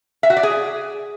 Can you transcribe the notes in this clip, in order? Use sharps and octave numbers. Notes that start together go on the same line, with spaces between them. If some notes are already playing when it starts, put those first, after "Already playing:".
E5
F#4
D5
G#4